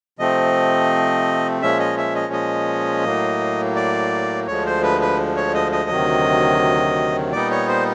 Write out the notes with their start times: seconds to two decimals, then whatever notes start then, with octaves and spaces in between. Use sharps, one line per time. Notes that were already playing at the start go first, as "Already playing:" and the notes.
0.19 C3 F3 A3 C4 D#5
1.62 A#2 F3 G#3 C#4 E5
1.79 D#5
1.98 E5
2.15 D#5
2.33 D#5
3.05 A2 F#3 A#3
3.76 D5
4.47 D2 D3 F3 G#3 C#5
4.66 C5
4.83 B4
5.01 B4
5.36 C#5
5.54 D#5
5.72 D#5
5.90 D2 C3 D#3 F#3
7.32 A#2 G3 B3 D#4 D5
7.51 C#5
7.68 C5